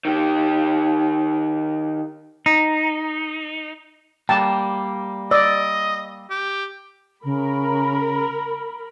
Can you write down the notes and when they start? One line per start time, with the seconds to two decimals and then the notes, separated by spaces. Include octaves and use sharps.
0.05 D#3 G4
2.46 D#4
4.29 G3 A#3 G5 A5
5.31 D5 D#5 E6
6.30 G4
7.24 C#3 A#4 B5